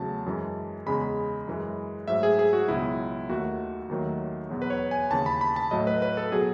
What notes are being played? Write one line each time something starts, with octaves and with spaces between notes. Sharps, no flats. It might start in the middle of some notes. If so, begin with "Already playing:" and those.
Already playing: E2 C#3 F#3 A3 A5
F#2 E3 G#3
E2 C#3 G#3 B5
F#2 E3 G#3
G#2 F#3 A3 E5
G#4
G#4
F#4
C#2 B2 F#3 E4
D#2 D#3 A3 F#4
D#2 D#3 F#3 A3
E2 B2 F#3
B4
C#5
G#5
D#2 C#3 E3 A5
B5
B5
A5
A2 F#3 A3 D#5
B4
B4
A4
B2 F#3 G#4